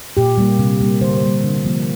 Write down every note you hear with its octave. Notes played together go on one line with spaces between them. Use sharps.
A#2 G4
G3 A#3
C3
G3 A#3
D3 C5
A#4
C5
G3 A#3
D3
F3 A#3